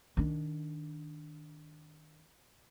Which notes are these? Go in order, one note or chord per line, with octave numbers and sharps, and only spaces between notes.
D#3 D4